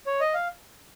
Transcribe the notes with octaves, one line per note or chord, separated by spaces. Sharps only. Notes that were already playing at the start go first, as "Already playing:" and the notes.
C#5
D#5
F5